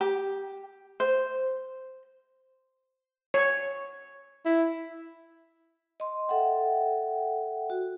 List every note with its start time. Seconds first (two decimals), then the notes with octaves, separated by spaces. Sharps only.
0.01 G4
1.00 C5
3.34 C#5
4.46 E4
6.00 D#5 C6
6.28 A4 E5 F#5 G5
7.70 F#4